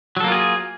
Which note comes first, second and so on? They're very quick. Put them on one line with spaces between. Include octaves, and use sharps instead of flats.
F#3 A4 A#3 F4 G#4